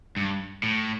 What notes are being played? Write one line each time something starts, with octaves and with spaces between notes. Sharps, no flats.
G2
A2